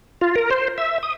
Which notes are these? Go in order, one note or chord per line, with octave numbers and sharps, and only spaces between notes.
F4
A#4
C5
E5
D#6